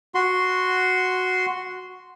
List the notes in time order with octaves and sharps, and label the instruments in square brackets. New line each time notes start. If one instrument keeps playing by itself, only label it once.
[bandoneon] F#4 C6